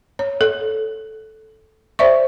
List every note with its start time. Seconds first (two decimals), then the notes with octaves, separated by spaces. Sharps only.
0.19 C#5
0.41 A4
1.99 C5 D5 E5 C#6